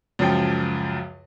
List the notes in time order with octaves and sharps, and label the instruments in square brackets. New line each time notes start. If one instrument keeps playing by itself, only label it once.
[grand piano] C#2 F#2 F3 G5